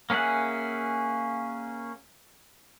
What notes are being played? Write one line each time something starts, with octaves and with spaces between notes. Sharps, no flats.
A#3 C#4 G#4 E5 F#5